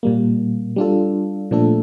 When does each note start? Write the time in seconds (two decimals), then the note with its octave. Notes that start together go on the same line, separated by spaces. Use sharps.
0.03 A#2 G3 A#3
0.76 G3 D4 F4 A4
1.51 A#2 F3 A3 D4 A4